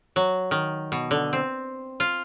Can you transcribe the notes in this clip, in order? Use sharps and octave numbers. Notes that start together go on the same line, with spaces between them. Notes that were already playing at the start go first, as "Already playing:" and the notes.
F#3
D#3
B2
D3
C4
F4